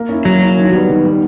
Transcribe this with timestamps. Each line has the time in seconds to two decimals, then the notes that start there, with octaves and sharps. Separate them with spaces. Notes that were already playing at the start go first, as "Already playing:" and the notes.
Already playing: A#3
0.09 C#4 E4
0.25 F#3 A#3
0.42 C#4 E4
0.58 D#3
0.73 G3 B3
0.89 D#3
1.05 G3 B3